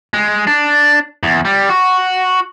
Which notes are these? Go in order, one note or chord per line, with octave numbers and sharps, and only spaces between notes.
G#3
D4
E2
G3
F#4